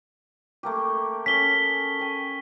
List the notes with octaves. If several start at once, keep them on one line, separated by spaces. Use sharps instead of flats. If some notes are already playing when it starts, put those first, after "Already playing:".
A3 A#3 G4
C#4 G#4 A4 B6 G7
G5 G#5